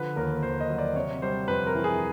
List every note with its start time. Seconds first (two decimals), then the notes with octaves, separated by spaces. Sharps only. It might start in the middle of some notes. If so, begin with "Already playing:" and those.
Already playing: D3 F3 B4
0.16 D#2 A#4
0.43 D#2 C5
0.60 D#5
0.69 F#3
0.78 D5
0.95 C3 C#5
1.22 G3 C5
1.48 F2 B4
1.67 A#4
1.75 E3
1.84 G#4